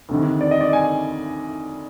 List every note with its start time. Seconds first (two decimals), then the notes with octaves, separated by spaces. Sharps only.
0.09 D2 C3 D#3
0.41 D5
0.51 D#5
0.61 D5
0.73 G#5